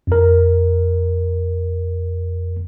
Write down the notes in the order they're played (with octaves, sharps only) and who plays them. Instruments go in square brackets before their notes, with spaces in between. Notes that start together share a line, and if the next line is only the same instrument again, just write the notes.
[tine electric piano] F2 A#4